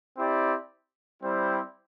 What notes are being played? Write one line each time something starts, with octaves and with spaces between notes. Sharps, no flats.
C4 E4 G4 D5
G3 C4 E4 C5